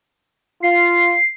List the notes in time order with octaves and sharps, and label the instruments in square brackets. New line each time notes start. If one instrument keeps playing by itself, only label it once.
[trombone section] F4 [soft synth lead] C7